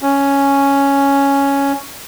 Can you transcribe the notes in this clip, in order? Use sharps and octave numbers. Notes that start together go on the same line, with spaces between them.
C#4